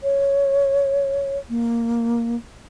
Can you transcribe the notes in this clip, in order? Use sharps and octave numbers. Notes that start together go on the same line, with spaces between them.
C#5
A#3